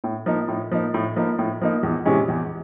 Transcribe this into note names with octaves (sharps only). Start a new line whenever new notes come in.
A2
F3 A#3 D#4
A2
F3 A#3 D#4
A2
F3 A#3 D#4
A2
F3 A#3 D#4
E2
C3 E3 G#3 C#4
E2